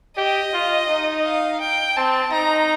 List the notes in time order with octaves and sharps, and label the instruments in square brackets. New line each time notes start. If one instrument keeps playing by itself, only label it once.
[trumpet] G4 [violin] D#5
[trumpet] F4
D#4
[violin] F5
G5
[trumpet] C4 [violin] A5
[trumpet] D#4 [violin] A#5